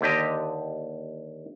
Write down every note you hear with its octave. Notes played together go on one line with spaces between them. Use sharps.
D#2 D3 G4 D#5